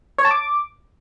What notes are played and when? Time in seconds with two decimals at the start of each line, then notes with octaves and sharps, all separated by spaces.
0.18 C#5
0.25 A5
0.31 D6